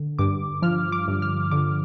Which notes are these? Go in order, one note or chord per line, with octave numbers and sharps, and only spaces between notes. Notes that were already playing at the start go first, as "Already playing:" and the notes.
Already playing: D3
G2 D6
F3 F6
D6
G2
F6
D3 D6